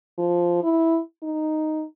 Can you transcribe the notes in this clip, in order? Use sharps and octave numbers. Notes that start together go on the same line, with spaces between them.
F3
E4
D#4